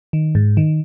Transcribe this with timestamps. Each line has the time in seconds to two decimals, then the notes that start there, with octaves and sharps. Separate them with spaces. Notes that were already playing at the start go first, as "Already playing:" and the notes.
0.13 D#3
0.35 G#2
0.57 D#3